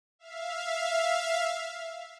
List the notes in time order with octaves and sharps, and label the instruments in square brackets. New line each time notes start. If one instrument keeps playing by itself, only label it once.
[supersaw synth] E5 F5